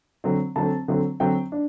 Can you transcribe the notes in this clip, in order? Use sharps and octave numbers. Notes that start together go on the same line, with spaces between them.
D3 F#3 A3 C4
D3 F#3 A3 C4 A5
D3 F#3 A3 C4
D3 F#3 A3 C4 G5
D4